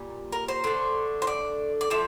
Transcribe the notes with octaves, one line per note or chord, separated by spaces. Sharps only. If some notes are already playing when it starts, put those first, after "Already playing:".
Already playing: A#2 G3
A#4
C5
D3 A3
C5
D5
D5
D3 F3 E5